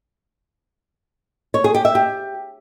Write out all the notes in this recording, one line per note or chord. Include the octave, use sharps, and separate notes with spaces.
C#5
G#4
G4
E5
G4